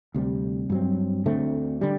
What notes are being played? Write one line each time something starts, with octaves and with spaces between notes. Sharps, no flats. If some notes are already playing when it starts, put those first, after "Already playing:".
D2 C3 G3
G2 F#3 C4
D2 D3 A3 C4
D3 G3